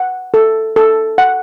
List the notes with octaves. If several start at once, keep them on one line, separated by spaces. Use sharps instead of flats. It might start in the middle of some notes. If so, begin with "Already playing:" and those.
Already playing: F#5
A4
A4
F#5